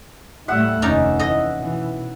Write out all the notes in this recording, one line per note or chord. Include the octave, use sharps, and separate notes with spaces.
A2 G3 A3 E5 F#5
F1 D#2 C#4 D#4 D5
E3 D#5
B2 E3